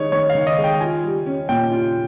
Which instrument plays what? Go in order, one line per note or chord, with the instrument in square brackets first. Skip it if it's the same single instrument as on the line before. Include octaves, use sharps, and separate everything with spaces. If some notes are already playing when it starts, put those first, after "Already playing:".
Already playing: [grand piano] D#3 G#3 D#4 [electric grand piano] C#5
[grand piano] D#3 [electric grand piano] C#5
[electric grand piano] F5
[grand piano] D#3
[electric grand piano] D#5
[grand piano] G#3
[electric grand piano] G5
[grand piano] F4 [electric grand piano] G#5
[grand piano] G3
C#4
[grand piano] A#2 [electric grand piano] G5
[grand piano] F4